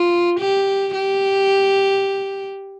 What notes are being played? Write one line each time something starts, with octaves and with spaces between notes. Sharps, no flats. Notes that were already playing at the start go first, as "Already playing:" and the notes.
Already playing: F4
G4
G4